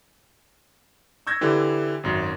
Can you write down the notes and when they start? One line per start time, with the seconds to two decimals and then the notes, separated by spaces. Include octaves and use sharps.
1.27 C#6 E6 G6 G#6 A#6
1.41 D3 E3 G4
2.03 G#1 F#2